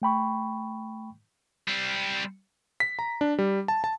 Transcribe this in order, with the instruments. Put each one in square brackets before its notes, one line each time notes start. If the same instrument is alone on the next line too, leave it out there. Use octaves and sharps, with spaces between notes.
[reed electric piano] A3 G5 B5 C#6
[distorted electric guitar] G3 C4
[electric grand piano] B6
A#5
D4
G3
A5
A5